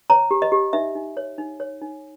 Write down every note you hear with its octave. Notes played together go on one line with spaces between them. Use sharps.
C#5 A#5
G4
D#5
G4
D#4 E5
D#4
C#5
D#4
C#5
D#4